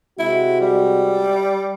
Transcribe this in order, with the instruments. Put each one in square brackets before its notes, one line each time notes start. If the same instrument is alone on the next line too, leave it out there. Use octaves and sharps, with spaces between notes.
[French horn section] C3 G#3 F#4 [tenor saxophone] E4
[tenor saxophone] G3